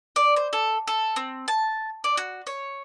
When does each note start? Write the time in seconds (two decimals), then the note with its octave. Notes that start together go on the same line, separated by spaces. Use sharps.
0.16 D5
0.36 C5
0.53 A4
0.87 A4
1.16 C4
1.48 A5
2.04 D5
2.17 F#4
2.47 C#5